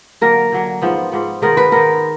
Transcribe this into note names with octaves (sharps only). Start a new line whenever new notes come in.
D3 F#3 A#3 A#4
D3 F#3 A#3
G#2 F3 B3
G#2 F3 B3
D#3 G#3 B3 A#4
B4
D#3 G#3 B3 A#4